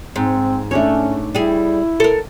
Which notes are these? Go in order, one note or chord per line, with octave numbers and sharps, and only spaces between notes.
G#2 C4
A3 C#4 D4 C#5
G3 E4 G#4
A4 A#4